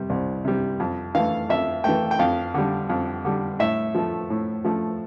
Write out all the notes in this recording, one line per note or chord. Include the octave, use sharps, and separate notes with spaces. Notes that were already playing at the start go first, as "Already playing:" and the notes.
Already playing: C3 G3
C2
C3 G3
F2
E3 A3 F5
F2 E5
E3 A3 G5
G5
F2 F5
D3 G3
F2
D3 G3
A2 E5
F3 A3
A2
F3 A3